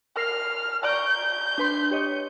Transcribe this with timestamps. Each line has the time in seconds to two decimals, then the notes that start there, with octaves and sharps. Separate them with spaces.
0.17 A#4 F6 C7
0.84 D5 A#5 C#6 G6
1.58 D4 B4 C6
1.91 G4 C#5 D#5